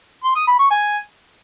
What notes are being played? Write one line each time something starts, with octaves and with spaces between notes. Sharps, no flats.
C6
D#6
B5
C#6
G#5